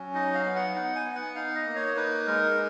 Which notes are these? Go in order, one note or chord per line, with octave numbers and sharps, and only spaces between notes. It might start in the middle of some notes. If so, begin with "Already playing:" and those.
Already playing: F#3 C#4
D#4 D#5
F5
B3
F#5
D#4 F#5
G#5
B3
F#5
D#4 F5
D#5
A#3
C#5
D#4 B4
G#3 A#4